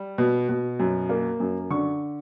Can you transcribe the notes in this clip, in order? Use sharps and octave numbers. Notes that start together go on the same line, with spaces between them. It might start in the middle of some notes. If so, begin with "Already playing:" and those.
Already playing: G3
B2
B2
F#2
A#3
F#2
D3 C#6